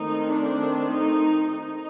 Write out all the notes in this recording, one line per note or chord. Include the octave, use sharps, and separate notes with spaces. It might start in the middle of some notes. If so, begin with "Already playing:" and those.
Already playing: D#3 A3 C4 D#4
D4
D#4
D#4